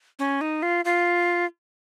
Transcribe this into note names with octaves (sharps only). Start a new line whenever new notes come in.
C#4
D#4
F4
F4